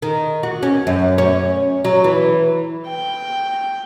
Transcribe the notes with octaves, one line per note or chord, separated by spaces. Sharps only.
D#3
F#4
C#4
F#2
C#4
F#3
E3
G5